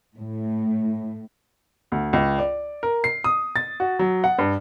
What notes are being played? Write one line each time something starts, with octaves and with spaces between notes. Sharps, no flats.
A2
D2
C#2
D5
A#4
C7
D#6
A6
F#4
F#3
F#5
G2